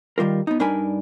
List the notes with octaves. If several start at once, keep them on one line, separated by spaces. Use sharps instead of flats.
D#3 G3 F4 A#4
B3 D#4
G2 D4 D#4 A#4 G#5 B5